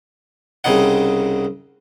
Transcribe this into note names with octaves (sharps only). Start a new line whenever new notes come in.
C2 C#3 C4 D#4 F#5